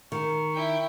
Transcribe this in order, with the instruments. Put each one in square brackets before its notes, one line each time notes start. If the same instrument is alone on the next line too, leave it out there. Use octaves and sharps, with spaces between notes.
[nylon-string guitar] D#3 [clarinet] C#6
[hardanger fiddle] E4 G5